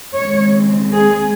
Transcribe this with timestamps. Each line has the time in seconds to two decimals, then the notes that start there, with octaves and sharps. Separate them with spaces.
0.14 D#2 C#3 G#3 C4 C#5
0.93 G#4